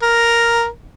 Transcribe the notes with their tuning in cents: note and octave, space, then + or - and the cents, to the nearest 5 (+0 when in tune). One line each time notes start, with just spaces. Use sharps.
A#4 +0